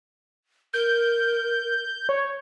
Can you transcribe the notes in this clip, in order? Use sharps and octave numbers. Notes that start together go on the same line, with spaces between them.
A#4 G6
C#5